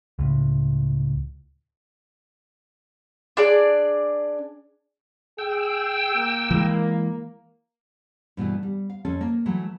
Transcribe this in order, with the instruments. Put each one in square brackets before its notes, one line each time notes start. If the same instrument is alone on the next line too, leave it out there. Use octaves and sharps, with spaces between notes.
[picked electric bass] C#2 A2
[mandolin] D4 G#4 D5
[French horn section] G#4 [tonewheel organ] G5 E6
[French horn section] A#3
[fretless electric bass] E3 G#3
[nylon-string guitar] G2 B2 E3 A3
G3
F5
F2 C#4 A4
A#3
E3 F#3 A3